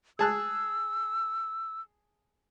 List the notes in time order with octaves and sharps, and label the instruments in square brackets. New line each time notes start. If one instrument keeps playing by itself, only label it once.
[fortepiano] G#4 A5 F#6 [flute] E6